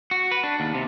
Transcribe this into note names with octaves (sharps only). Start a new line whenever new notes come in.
F#4
B4
D4
D#2
C3